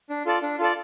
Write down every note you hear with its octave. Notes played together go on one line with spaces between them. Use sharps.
D4
F4 A4 D5
D4
F4 A4 D5